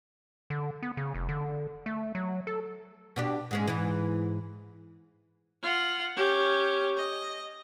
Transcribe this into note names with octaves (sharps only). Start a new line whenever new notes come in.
D3
B3
C#3
F1
D3
A3
F#3
A4
B2 D4 G4
G#2 G#3 C#4
G#2 E3
F4 F#5
C#4 G4
D#5